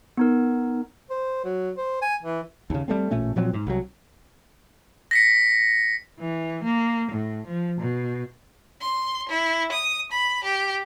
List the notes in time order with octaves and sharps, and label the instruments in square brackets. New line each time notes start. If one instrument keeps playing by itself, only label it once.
[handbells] B3 D#4 A#4
[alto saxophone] C5
F#3
C5
G#5
E3
[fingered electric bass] D#2 C#3
G3 A3 C4
A1 A#2 A3 C#4
A#2 F3 F#3 C4
G#2
C2 F#3
[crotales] A#6 B6 C#7
[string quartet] E3
A#3
A2
F3
B2
[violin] C6
E4
D#6
B5
G4